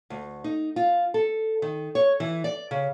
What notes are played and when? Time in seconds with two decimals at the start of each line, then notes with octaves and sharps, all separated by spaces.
0.10 D2
0.44 D#4
0.76 F4
1.14 A4
1.62 D#3
1.95 C#5
2.20 E3
2.44 D5
2.71 C#3